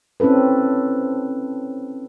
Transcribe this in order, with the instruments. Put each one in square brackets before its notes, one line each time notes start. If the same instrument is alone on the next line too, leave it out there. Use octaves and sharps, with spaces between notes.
[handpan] C4 C#4 E4 A4 B4